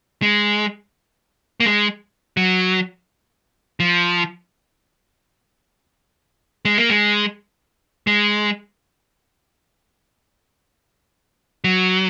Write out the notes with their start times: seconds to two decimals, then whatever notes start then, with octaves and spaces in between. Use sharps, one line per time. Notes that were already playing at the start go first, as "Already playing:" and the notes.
0.22 G#3
1.60 A#3
1.65 G#3
2.37 F#3
3.80 F3
6.65 G#3
6.77 A#3
6.90 G#3
8.07 G#3
11.64 F#3